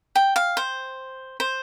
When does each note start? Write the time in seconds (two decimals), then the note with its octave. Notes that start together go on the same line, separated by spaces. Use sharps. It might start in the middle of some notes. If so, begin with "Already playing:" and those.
0.15 G5
0.36 F5
0.57 C5
1.40 C5